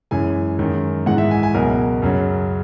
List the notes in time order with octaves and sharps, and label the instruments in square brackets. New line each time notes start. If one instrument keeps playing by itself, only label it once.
[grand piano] F#2 E3 G#3 G#5
F#2 D#3 G#3
G#2 E3 G#3 F#5
E5
G#5
G#5
C#2 B2 F#3 A#4
F#2 C#3 F#3